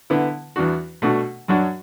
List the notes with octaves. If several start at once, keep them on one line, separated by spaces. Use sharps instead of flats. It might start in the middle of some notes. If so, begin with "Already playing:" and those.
D3 B3 E4
E2 E3 D4 F#4
B2 A3 D4 F#4
F#2 F#3 D4 F#4